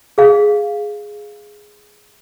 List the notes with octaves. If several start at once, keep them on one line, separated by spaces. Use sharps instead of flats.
G#4 F5